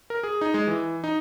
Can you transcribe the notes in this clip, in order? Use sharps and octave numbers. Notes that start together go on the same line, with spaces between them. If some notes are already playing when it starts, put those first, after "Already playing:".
A#4
G#4
D#4
G#3
E3
D#4